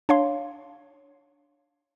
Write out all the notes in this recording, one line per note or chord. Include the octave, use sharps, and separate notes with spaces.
D4 C#5 F5 C6